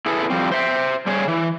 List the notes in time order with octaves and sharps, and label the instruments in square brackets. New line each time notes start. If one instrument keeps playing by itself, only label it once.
[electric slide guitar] E4 G#4 A4 B4
F3 G3 C4
C5 E5
G3 G#4 C#5
E3